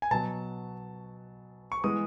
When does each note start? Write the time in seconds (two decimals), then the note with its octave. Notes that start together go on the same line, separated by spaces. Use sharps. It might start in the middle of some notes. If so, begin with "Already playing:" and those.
0.02 G#5
0.11 B2 F#3 B3 A5
1.72 C#6
1.84 E3 G#3 B3 D#6